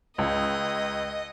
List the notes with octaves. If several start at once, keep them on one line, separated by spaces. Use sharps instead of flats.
C#2 D#5